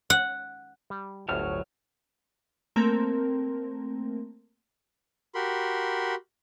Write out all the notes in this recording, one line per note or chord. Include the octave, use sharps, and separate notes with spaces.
F#5
G3
G1 D2 A2 F#3 C#5 F6
A3 A#3 C4 A#4
F#4 G4 A#4 B5 C6